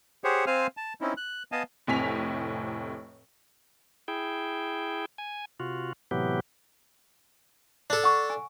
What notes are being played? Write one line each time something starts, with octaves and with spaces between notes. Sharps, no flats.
G4 G#4 C5 C#5 F#5
C4 C5 F5 G#5 F6
A5
C4 C#4 D#4 E4
F#6
B3 D#5 F5 G#5 A5
F1 A2 C3 G#5 B6 F7
E4 G#4 G5
G#5
C3 F4 F#4
A2 C3 E3 F#3 B3 G4
D4 A4
F#5 C#6
G#5